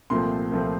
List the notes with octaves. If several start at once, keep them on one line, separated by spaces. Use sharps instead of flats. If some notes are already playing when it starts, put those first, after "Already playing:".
C2 A#2 F3 A3 C4 C6
C2 A#2 F3 A3 C4